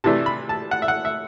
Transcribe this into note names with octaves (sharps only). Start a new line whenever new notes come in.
C3 E3 A3 D4 A5
B5
A5
F#5
E5
F#5
E5